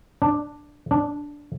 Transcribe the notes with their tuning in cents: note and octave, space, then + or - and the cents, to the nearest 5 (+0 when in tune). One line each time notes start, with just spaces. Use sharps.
D4 +5
D4 -5